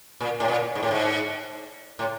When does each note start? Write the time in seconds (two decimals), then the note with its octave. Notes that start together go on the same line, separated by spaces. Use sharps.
0.20 A#2
0.40 A2
0.48 A#2
0.75 G#2
0.83 A2
0.91 G#2
1.99 A2